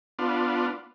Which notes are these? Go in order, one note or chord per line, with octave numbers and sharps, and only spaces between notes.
B3 D4 F4